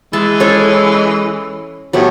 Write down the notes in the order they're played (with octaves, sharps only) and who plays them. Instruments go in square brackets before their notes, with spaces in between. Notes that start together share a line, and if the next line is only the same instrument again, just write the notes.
[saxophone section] E3 G#3 [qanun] E5 A5
[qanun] C#4 A4 C#5
[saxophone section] A2 G4 [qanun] F#3 B3